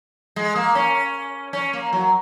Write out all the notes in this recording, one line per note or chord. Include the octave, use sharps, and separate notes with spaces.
G#3
A#3
C#4
C#4
A#3
F#3